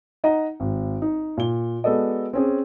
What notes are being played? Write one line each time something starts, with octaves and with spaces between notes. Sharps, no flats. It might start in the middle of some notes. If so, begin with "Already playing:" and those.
D#4 D#5 F#5 A#5
G#1
D#4
A#2 G7
G#3 B3 F#4 A4 D5 D#5
C4 C#4 G#4